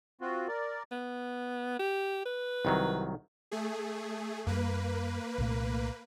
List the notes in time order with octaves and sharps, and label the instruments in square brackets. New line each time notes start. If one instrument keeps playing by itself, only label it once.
[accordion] C4 F4 F#4
A#4 D5
[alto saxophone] B3
G4
B4
[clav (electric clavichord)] C2 D#3 F#3
[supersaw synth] A3 G#4
[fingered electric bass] F#2 G3 [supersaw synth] A#3 B4
[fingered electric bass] C2 A#2 A3